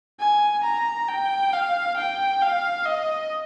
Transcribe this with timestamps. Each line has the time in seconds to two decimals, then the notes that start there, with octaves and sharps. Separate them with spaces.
0.20 G#5
0.64 A#5
1.08 G5
1.53 F5
1.97 G5
2.42 F5
2.85 D#5